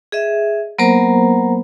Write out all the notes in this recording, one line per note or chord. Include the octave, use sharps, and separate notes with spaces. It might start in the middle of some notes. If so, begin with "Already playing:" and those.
G#4 D#5 E5
F#3 A#3 B3 A#4 C5 A#5